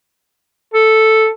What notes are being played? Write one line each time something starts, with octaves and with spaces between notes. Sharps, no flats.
A4